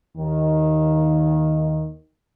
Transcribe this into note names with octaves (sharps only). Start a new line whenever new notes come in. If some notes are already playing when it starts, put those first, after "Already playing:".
D#2 D#3